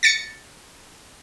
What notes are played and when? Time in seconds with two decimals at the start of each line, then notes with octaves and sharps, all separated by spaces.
0.03 A6 A#6 C#7